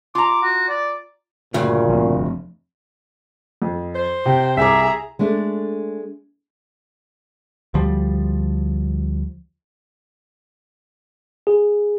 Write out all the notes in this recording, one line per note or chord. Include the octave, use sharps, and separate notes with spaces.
F4 A#5 D6
F#4
D5
D2 G2 A#2 C#3
F3 A3 C4
F2
C5
C3 G5
C2 G#4 E5 A#5 D6
G#3 A3 D4
D2 F3 G3
G#4